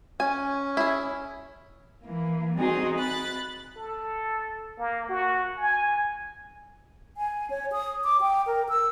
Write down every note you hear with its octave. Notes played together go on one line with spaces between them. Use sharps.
C#4 G#5
E4 G#4
E3 A#3
G3 C4 D#4 F#4 G#4 D#5
B5 F#6 A6
A4
A#3
F#4
G#5
G#5
C#5
D#6
D6
G5
A#4
E6